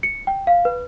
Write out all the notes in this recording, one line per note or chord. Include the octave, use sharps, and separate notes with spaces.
C#7
G5
F5
B4